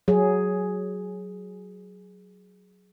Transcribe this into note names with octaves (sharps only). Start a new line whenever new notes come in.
F#3 G#4